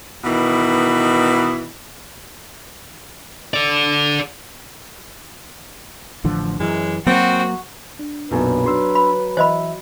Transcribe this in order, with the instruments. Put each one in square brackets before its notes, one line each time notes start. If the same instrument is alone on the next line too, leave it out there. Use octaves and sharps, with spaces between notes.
[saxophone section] B2 D#3 E3
[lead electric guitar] A4 D5
[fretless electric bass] A1 D3 F3
[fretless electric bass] F#2 E3 [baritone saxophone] G#3
[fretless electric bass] F#3 A#3 [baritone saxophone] C4 [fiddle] F#4
[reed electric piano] D4
[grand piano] B1 F#2 A#2 [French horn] B4
[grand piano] F#3 [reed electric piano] D4 C6 E6
[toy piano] B5
[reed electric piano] E3 E5 [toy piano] C5 D#5 B5